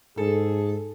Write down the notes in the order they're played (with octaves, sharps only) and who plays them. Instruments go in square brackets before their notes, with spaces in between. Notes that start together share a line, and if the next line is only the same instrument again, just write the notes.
[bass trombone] G#2 [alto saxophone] G#4 [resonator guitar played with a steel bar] A4